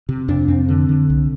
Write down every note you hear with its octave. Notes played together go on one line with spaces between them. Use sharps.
C3
F2 D4
F2 C4
D3
D3
C2